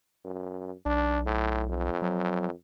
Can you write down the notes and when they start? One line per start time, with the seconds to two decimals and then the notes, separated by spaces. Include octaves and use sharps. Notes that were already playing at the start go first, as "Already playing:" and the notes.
0.24 F#2
0.86 B1 D4
1.26 A2
1.69 F2
2.02 F#3